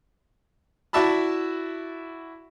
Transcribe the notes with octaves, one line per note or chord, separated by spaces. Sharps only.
E4 F#4 D5 E5 A5 B5